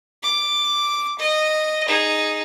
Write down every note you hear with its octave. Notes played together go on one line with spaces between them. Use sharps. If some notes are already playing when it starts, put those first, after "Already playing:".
D6
D#5
D#4 G#4